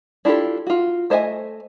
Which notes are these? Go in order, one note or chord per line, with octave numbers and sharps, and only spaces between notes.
D4 E4 F4 G4 A4
F4 F#4
A3 C5 D#5 E5 G#5